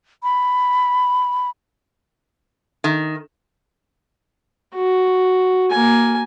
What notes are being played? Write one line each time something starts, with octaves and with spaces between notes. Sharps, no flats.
B5
D#3
F#4
A#3 G#5